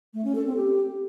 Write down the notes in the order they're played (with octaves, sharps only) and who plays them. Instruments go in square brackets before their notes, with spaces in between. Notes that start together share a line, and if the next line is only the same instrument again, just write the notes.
[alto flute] A3
C#4
A4
C4
G4